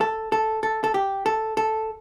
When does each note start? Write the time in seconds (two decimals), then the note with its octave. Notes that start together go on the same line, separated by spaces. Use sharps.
0.01 A4
0.32 A4
0.63 A4
0.84 A4
0.94 G4
1.26 A4
1.57 A4